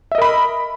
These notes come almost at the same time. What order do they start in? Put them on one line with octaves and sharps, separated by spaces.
E5 D#5 A#4 B5